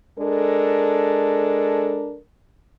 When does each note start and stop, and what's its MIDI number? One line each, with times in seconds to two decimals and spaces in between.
0.18 2.17 56
0.18 2.17 62
0.18 2.17 69
0.18 2.17 70